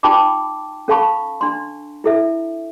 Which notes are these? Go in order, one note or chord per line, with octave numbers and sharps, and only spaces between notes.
D#4 F4 G5 A5 B5 D6
C#4 A4 F5 A5 B5 C#6
D4 C6
E4 A4 E5